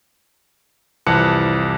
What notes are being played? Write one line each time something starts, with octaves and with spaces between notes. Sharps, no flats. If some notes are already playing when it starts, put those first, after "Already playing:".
C2 F2 E3 A5 F#6 C#7